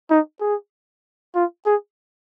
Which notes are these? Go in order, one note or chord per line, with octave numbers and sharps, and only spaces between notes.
D#4
G#4
F4
G#4